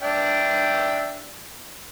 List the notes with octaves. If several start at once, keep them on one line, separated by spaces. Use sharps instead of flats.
D4 E5 G5